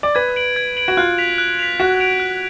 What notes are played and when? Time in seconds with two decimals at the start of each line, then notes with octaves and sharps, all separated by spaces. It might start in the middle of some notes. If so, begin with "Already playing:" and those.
0.03 D5
0.15 B4 G#6
0.36 D7 F#7
0.56 G#6
0.77 D7 F#7
0.88 F#4
0.97 F4 F#6
1.18 B6 F7
1.38 F#6
1.59 B6 F7
1.80 F#4 F#6
2.00 D7 F7
2.20 F#6